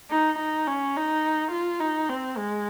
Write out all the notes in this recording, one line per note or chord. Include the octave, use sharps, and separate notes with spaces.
D#4
D#4
C#4
D#4
F4
D#4
C4
G#3